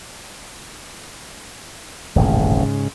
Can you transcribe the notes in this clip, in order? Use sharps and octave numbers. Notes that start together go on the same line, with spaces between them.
D#1 A1 F2 G#2 C#3